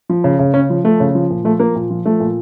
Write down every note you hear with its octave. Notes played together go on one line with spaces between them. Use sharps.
F3
C#3
C#3
C#3 C#4
F3
F3 A3
C#3
F3
A#2
F3 A3
F3 A#3
A#2
F3
F3 A3
A#2